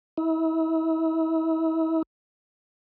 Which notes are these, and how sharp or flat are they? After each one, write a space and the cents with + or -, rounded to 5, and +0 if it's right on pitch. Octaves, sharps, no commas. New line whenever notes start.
E4 -35